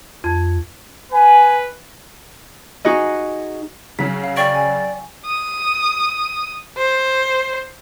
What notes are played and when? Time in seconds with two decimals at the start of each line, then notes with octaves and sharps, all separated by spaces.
0.24 F2
1.12 B4 G#5
2.85 D#4 F#4 G#4 D#5
3.99 C#3 F#3 B6
4.24 F5
4.37 D5 G5 C#6 D7
4.55 G#5
5.26 D#6
6.77 C5